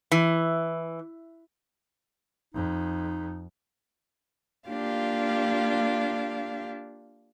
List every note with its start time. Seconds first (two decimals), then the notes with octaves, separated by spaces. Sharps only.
0.12 E3
2.54 F2 D#4
4.68 A#3 D4 F4 G4 F5